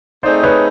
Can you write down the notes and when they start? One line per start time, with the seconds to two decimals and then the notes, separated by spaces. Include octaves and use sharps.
0.23 A3 C4 D#4 G#4 C5 D5
0.43 B4 C#5